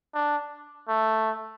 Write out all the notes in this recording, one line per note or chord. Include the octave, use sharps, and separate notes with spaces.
D4
A3